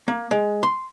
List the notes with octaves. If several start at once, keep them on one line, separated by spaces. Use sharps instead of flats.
A#3
G#3
C6